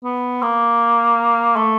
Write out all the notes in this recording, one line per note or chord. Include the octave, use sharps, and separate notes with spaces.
B3
A#3
A3